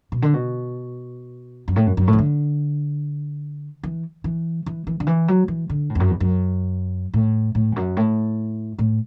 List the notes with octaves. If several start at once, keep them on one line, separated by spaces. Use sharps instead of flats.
B2
D3
B2
F#2
A2
F#2
F#2
A2
E3
D3
E3
E3
E3
E3
D3
E3
F#3
E3
D3
A2
E2
F#2
E2
F#2
A2
A2
E2
F#2
A2
A2